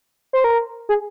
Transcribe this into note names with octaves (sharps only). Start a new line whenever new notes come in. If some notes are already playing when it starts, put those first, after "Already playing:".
C5
A#4
G#4